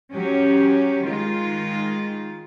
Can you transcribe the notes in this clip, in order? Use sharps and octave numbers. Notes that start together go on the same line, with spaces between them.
F#3 C#4 G4
D#3 G#3 F4